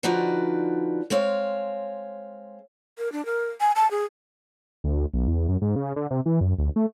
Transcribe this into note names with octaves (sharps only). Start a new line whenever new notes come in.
D3 F3 D#4 F#4 B4 D5
G#3 C4 C#5 F5
A#4
D4
A#4
G#5
A5
G#4
D2
B1
E2
F#2
G#2
C#3
D3
C3
E3
F#2
D2
A3